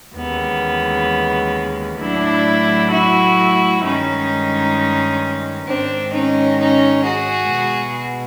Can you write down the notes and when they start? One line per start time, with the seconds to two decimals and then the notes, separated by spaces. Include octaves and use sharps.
0.15 D#2 C#3 E3 G#3 B3
1.98 A2 F#3 A3 D4 E4
2.91 E4 F#4
3.83 G2 D#3 G#3 C#4 D#4
5.67 G#2 D#3 G#3 C4 D4
6.13 C#4 D#4
6.59 C#4 D#4
7.05 F#4 G#4
7.51 B2 G#3